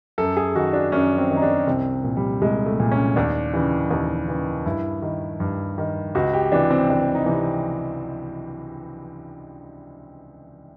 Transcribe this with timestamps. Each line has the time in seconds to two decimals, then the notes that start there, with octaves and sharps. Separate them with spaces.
0.18 F#2 A4
0.37 G#4
0.55 D#3 F#4
0.73 D4
0.92 F#2 C#4
1.18 C4
1.30 D#3
1.37 D#4
1.42 D4
1.67 C2 C4
2.04 A#2
2.17 G3
2.41 C2 G#3
2.66 A3
2.80 A#2
2.92 C#4
3.16 D#2 D4
3.53 C#3 E3
3.91 D#2
4.28 C#3 E3
4.65 G2 E4
5.02 D#3
5.40 G2
5.78 D#3
6.15 C#2 F#4
6.33 G4
6.52 C3 E3 D4
6.71 C4
6.90 C#2 D4
7.15 D#4
7.26 C3 E3